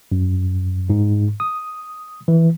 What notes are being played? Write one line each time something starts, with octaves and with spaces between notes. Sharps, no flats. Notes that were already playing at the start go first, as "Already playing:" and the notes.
F#2
G#2
D#6
E3